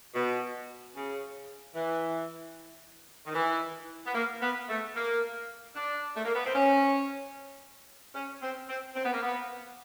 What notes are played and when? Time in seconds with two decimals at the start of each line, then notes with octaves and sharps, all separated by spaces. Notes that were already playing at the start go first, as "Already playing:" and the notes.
0.15 B2
0.95 C#3
1.75 E3
3.27 D#3
3.35 E3
4.06 B3
4.15 A#3
4.42 B3
4.69 A3
4.95 A#3
5.76 D4
6.16 A3
6.25 A#3
6.35 B3
6.46 C4
6.55 C#4
8.15 C#4
8.42 C4
8.69 C4
8.95 C4
9.05 B3
9.13 A#3
9.23 B3